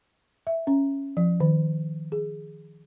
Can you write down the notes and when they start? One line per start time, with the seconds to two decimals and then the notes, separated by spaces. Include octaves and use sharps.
0.47 E5
0.67 C#4
1.17 F3
1.40 D#3
2.12 G#4